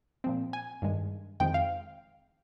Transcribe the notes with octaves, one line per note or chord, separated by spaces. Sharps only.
A#2 F3 C4
G#5
G2 D#3 G#3
F2 D#3 G#3 C4 G5
F5